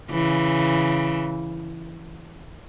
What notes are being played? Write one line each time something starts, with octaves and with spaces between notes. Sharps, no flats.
C#3 E3